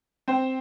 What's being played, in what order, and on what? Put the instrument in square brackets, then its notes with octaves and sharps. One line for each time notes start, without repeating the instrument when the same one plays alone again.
[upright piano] C4 C5